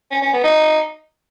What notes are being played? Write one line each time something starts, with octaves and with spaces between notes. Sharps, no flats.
C#4
C#4
B3
D#4